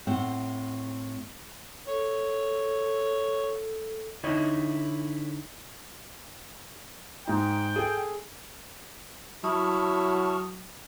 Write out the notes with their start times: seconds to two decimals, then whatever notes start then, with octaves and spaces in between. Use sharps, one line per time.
0.07 A2 C4 F#5
1.88 A4 C#5
4.23 D3 D#4 E4 C#5 D#5
7.27 G#2 D#4 G5
7.76 G#4 A4
9.44 F#3 E4 A5 C#6 D#6 F6